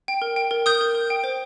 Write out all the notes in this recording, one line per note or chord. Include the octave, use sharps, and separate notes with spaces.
G5
A#4
G5
A#4
A#4 D#6 G6
A#4
A#4
G5
C5